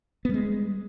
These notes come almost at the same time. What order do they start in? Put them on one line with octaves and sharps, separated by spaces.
B3 G3 G#3